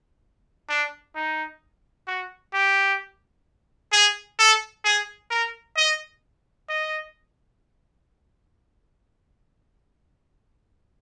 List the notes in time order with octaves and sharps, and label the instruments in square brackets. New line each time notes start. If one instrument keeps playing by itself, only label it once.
[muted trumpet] D4
D#4
F#4
G4
G#4
A4
G#4
A#4
D#5
D#5